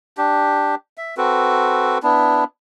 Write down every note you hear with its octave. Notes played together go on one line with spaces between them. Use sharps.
D4 G4
E5
C4 F#4 A4 B4
B3 D4 E4